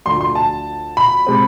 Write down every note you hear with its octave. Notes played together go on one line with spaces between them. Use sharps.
D2 D3 F3 C6
C6
A5
B5
C3 G#3 C4